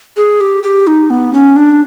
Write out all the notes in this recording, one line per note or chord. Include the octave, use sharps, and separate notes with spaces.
G#4
G4
G4
D#4
B3
C#4
D4